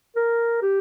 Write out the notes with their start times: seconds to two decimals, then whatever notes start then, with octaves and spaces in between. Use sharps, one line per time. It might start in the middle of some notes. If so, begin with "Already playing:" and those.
0.16 A#4
0.62 G4